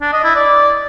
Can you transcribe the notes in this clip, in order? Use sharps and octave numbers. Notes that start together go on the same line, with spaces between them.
D4
D#5
E4
D5